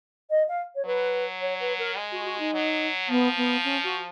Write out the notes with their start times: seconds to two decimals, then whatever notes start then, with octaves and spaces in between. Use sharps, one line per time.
0.30 D#5
0.48 F5
0.75 C#5
0.86 F#3 B4
1.41 C#5
1.60 B4
1.79 A#4
1.97 G#3
2.12 F#4
2.25 F#4
2.39 D#4
2.54 F#3
3.08 F3 B3
3.37 B3
3.64 C#4
3.83 F#4